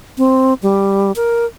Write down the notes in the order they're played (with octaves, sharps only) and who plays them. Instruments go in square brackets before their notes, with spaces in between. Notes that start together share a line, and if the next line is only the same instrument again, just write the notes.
[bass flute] C4
G3
A#4